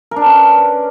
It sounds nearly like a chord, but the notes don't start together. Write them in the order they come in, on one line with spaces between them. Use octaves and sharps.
A#4 D4 B4 C#4